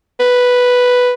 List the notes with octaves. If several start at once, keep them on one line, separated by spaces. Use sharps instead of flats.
B4